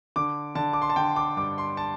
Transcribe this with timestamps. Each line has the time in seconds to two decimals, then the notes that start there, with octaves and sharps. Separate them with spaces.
0.16 D3 D6
0.55 D3 A5
0.73 D6
0.82 C6
0.90 A5
0.96 D3 G5
1.16 D6
1.37 G2 D6
1.58 C6
1.77 A5